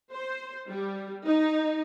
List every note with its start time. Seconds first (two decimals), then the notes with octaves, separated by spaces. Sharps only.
0.13 C5
0.69 G3
1.25 D#4